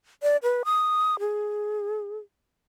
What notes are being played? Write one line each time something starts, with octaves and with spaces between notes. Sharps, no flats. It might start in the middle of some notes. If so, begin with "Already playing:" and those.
D5
B4
D#6
G#4